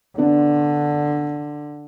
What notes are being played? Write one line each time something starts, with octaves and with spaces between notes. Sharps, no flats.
D3 B3 D4